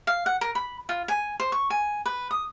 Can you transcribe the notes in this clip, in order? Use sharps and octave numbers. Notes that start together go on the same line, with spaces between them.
F5
F#5
A#4
B5
F4
G#5
C5
C#6
G#5
B4
D#6